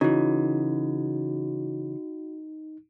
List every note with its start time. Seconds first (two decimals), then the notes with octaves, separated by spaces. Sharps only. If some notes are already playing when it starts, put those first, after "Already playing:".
0.01 C#3 E3 D#4 F#4